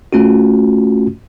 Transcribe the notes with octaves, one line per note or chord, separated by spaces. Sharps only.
A3 C#4 F4 F#4